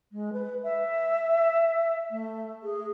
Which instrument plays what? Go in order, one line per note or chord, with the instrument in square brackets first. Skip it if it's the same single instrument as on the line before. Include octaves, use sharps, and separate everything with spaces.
[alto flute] G#3
B4
E5
A3
G#4